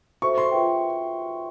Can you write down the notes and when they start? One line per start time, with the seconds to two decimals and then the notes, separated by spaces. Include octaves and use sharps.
0.22 F#4 A4 C5 E5 C#6
0.38 C6
0.51 F4 G#4 B4 E5 G5